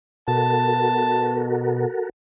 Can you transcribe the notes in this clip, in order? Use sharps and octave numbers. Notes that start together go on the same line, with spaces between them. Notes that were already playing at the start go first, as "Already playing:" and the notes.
B2 F#4 A4 A#4 A5